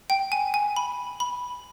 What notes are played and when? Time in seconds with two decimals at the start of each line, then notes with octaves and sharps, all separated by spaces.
0.10 G5
0.32 G#5
0.54 G#5
0.76 B5
1.20 B5